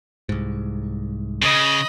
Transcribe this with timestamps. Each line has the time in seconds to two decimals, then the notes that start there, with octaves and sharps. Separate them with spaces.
0.29 C2 G#2
1.42 C#3 D#5 B5